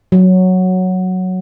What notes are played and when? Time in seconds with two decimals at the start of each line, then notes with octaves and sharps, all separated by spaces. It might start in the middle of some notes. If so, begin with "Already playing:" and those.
0.12 F#3